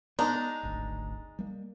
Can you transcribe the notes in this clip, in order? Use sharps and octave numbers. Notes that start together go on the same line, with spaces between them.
G#3 B3 D4 D#4 A#5
D1 G#1 D2
G3 A#3